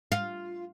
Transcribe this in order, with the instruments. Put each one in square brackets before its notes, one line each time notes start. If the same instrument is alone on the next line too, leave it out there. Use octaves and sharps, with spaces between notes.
[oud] F4